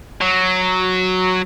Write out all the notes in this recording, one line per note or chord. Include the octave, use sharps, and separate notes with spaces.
F#3